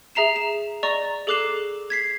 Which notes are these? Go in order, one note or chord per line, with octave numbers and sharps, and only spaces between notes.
G#4 E5 A#5 C7 E7
E7
D5 D#5 A#5 C#6
G#4 A4 D6 F#6 C7 E7
G#6 B6 C7